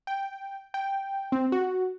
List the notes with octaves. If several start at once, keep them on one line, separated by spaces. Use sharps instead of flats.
G5
G5
C4
F#4